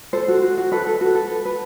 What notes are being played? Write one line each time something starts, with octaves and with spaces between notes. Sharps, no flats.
A4 C5
F#4
F#4
F#4
A4 B4
A4
F#4
A4
B4
B4